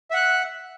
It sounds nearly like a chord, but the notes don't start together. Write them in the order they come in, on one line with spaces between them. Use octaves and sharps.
E5 F#5 F#6